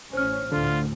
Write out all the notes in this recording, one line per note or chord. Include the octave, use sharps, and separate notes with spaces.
A1 C#4 C5 F6
D2 A2 D3 F4